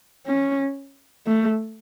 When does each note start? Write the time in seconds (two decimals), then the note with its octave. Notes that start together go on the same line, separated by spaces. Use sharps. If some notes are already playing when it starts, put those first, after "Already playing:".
0.27 C#4
1.27 A3